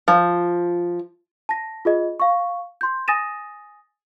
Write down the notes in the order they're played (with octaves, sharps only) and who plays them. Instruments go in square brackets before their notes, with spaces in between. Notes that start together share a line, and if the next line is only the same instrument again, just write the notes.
[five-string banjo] F3
[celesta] A5 A#6
F4 G#4 D#5
F5 C#6
C6 G6
G#5 D#6 A6 A#6 D#7 E7